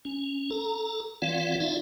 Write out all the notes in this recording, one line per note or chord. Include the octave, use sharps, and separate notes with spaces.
C#4
A4 A#5
E3 C4 F4 D5 F5 F#5
D#4 F4 D5 E5 F5